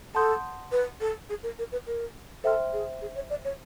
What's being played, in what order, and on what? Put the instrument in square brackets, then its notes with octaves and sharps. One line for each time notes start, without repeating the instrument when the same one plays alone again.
[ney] A4 [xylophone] F#5 A5 C6 D#6 G6
[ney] B4
A4
G#4
A#4
A#4
B4
A#4
[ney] A4 [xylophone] C5 E5 G5 C6 F6
[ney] G#4
G#4
C#5
D5
C#5